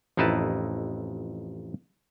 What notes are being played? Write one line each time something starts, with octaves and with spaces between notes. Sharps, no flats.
A1 F2 D#4 E4 B4 A5